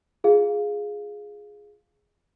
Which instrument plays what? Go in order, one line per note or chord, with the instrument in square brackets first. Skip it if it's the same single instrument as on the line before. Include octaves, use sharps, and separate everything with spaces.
[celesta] F4 G#4 F5